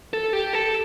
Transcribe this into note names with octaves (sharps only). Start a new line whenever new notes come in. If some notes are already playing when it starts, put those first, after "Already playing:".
A4
G4
A4